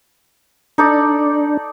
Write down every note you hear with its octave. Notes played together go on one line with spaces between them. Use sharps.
D4 D#4 A4 D5